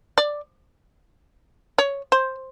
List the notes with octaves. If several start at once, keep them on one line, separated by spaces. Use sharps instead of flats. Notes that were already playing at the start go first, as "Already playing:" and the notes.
D5
C#5
C5